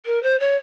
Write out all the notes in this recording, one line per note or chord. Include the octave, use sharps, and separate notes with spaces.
A#4
C5
C#5